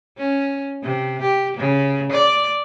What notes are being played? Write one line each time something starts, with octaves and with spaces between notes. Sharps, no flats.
C#4
C3
G4
C#3
D5